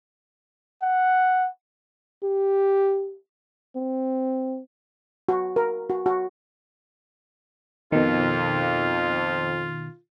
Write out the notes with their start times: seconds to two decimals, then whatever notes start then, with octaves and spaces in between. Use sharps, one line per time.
0.82 F#5
2.24 G4
3.76 C4
5.29 F#4
5.56 A#4
5.90 F#4
6.06 F#4
7.92 F2 B2 D#3 F4